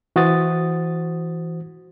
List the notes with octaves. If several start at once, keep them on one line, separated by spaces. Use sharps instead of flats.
E3 F#4 C5 D#6 A6